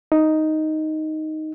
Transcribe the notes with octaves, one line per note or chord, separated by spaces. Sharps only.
D#4